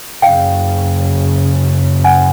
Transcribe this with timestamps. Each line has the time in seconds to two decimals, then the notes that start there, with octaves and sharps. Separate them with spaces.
0.22 F#1 F#2 C#3 F5 G5
2.04 F#5 G#5